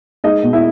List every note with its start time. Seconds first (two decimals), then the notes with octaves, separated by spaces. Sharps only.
0.24 G#3 D#4 D#5
0.43 B2
0.53 E4 E5